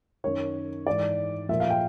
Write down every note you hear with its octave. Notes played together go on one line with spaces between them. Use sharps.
F#2 D#3 C#5
G#2 E3 D5
A#2 F3 E5
F5
G5